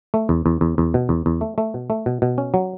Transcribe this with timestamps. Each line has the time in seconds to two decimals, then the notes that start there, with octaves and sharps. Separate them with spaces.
0.14 A3
0.29 E2
0.46 E2
0.61 E2
0.78 E2
0.94 B2
1.09 E2
1.26 E2
1.41 A3
1.58 A3
1.74 B2
1.90 A3
2.06 B2
2.22 B2
2.38 C#4
2.54 F#3